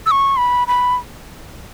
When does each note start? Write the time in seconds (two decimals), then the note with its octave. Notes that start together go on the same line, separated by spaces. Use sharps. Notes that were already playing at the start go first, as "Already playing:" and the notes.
0.06 E6
0.11 C#6
0.37 B5
0.68 B5